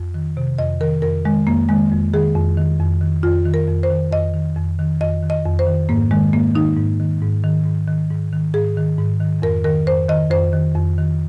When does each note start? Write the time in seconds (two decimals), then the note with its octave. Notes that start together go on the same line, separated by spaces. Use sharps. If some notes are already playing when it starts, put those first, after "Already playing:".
Already playing: F2
0.14 D#3
0.37 C3
0.58 F2 D#5
0.81 D#3 A#4
1.02 F2 A#4
1.25 D#3 G#3
1.47 F2 A#3
1.69 D#3 G#3
1.92 F2
2.13 D#3 G#4
2.35 F2
2.58 D#3
2.80 F2
3.01 D#3
3.23 F2 F4
3.46 D#3
3.54 A#4
3.69 F2
3.83 C5
3.90 D#3
4.12 F2 D#5
4.34 D#3
4.56 F2
4.79 D#3
5.01 F2 D#5
5.23 D#3
5.30 D#5
5.45 F2
5.59 C5
5.67 D#3
5.89 G#2 A#3
6.11 D#3 G#3
6.33 G#2 A#3
6.55 D#3 D#4
6.77 G#2
7.00 D#3
7.22 G#2
7.44 D#3
7.65 G#2
7.88 D#3
8.11 G#2
8.33 D#3
8.54 G#2 G#4
8.77 D#3
8.98 G#2
9.21 D#3
9.42 F2 A#4
9.64 D#3 A#4
9.87 F2 C5
10.09 D#3 D#5
10.31 F2 C5
10.53 D#3
10.75 F2
10.98 D#3